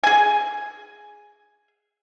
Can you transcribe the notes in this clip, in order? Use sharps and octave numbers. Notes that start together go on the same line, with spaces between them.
G#4 G#5